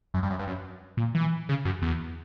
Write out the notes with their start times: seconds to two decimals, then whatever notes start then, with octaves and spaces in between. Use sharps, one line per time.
0.14 F#2
0.23 G2
0.30 F#2
0.39 G2
0.48 F#2
0.97 A#2
1.15 E3
1.49 C#3
1.65 F#2
1.82 E2